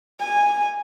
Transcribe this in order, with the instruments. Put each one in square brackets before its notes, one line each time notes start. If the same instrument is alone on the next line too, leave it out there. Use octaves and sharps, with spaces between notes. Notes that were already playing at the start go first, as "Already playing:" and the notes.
[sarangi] G#5